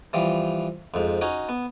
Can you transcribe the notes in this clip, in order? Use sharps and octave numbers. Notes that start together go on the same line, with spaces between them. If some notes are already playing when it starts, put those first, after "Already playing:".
E3 F3 G3
F2 G#2
C#4 D#4 F#4 C#5
B3